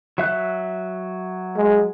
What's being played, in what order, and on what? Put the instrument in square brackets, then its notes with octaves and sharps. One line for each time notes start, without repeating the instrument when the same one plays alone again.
[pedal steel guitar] F#3 E5 F#6
[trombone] G#3